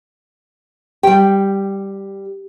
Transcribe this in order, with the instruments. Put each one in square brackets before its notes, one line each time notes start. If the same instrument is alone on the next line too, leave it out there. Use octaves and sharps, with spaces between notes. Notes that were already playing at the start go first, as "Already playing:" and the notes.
[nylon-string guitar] G3 G5 [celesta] G4